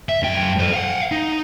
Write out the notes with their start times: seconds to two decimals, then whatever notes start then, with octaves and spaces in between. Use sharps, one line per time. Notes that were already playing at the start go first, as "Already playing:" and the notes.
0.09 E5
0.23 F#2 G5
0.59 A4 C5
0.73 F5 F#5
1.12 D#4